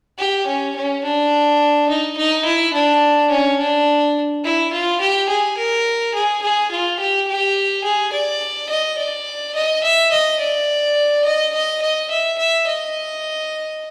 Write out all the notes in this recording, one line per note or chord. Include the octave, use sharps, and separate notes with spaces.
G4
C#4
C#4
D4
D#4
D#4
E4
D4
C#4
D4
E4
F4
G4
G#4
A#4
G#4
G#4
F4
G4
G4
G#4
D5
D#5
D5
D#5
E5
D#5
D5
D#5
D#5
D#5
E5
E5
D#5